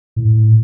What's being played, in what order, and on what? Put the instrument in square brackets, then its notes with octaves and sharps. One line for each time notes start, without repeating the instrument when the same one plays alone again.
[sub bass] A2